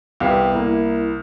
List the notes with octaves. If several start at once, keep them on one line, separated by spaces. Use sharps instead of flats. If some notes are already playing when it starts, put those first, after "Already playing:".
C2 B3 G4 F5
A#3 E4